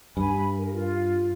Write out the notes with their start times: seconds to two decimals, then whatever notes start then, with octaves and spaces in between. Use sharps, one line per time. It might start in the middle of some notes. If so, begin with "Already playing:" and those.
0.17 G2 G#5 B5
0.58 A#4
0.74 F4